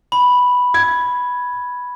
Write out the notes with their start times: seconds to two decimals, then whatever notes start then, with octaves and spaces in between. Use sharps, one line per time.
0.12 B5
0.74 G#6